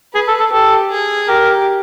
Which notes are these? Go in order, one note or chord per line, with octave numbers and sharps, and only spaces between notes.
G#4 B4
A4
A4
G4 A4
G#4
G4 A#4